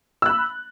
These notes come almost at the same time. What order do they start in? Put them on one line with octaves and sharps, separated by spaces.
E6 F#6 B5